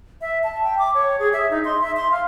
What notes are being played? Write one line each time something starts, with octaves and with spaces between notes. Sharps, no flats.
E5
A5
G5
D6
C#5
G#4
E5
D#4
C6
E5
C6
F5